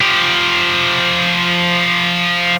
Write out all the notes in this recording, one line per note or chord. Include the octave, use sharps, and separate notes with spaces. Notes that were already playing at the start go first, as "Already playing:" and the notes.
F3 G4